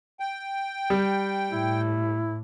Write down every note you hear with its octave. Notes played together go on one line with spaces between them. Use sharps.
G5
G3
A2 E4